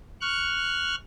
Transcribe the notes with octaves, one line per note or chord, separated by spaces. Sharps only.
C#6 F6 F#6